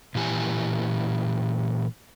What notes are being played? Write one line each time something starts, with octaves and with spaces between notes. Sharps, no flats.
A#2 E3 G4 G#5